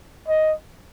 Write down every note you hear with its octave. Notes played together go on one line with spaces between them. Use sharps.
D#5